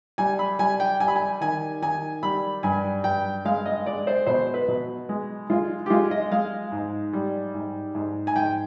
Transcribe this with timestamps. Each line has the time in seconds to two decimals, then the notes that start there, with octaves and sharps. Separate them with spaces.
0.18 G3 G#5
0.39 B5
0.59 G3 G#5
0.80 G5
1.00 G3 G#5
1.08 B5
1.16 G#5
1.41 D#3 G#5
1.82 D#3 G#5
2.23 G3 B5
2.63 G2 G#5
3.04 G2 G5
3.45 G#3 F5
3.66 D#5
3.86 G#3 D5
4.07 C5
4.27 B2 C5
4.54 B4
4.68 B2
5.09 G#3
5.50 G#3 F4
5.86 G4
5.90 G#3 F4
6.11 D#5
6.31 G#3 F5
6.72 G#2
7.13 G3
7.54 G#2
7.95 G#2
8.27 G#5
8.36 G#2 G5